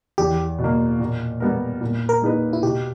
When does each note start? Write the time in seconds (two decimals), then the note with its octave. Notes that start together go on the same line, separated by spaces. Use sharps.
0.18 E2 G4
0.59 B2
0.64 A#3
1.00 A#2
1.40 G3 B3 G4 A#4
1.81 A#2
2.09 A#4
2.22 A#3 D#4 G#4 B4
2.53 E4
2.63 B2 G4